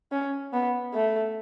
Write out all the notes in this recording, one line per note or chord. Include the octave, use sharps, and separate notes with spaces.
C#4
B3
A3